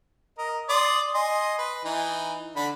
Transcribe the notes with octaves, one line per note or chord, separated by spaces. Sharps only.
A#4 D#5
D5 C6 D#6
D#5 G#5 C6
B4
E3 D#4
D3 D4 B5